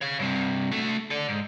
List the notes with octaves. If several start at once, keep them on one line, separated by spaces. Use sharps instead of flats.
C#5 F5
G2 C3
A3 F#4
A4 D5
G#2